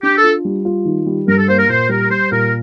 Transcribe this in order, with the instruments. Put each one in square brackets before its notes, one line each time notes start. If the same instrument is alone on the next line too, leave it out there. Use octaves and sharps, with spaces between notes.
[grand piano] D4 [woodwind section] G4
[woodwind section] A4
[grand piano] F4
G3
F4
D#3
G3
[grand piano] G2 [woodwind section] A#4
[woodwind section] A4
[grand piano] A#3 [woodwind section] C5
[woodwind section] A#4
[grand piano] A#2 [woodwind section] C5
[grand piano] G3 [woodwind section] A#4
[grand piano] G3 [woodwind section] C5
[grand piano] A#2 [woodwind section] A#4